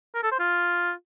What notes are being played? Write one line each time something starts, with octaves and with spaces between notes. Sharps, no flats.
A#4
A4
C5
F4